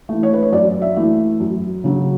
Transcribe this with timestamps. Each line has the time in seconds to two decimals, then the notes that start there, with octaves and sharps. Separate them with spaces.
0.09 E3 A3
0.23 C#5
0.33 B4
0.43 C#5
0.52 F#2 D5
0.82 E5
0.96 E3 A3
1.40 F#2
1.84 C#3 F#3